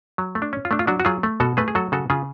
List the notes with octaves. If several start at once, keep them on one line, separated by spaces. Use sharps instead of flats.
F#3
A3
D4
C#4
F4
A3 D4
F4
F#3 D4 F#4
F#4
F#3 F4 G#4
A3
B2 F#4 A4
A3 G#4 B4
G#4
F#3 F#4 A4
C#3 F#4 A4
C#3 F4 G#4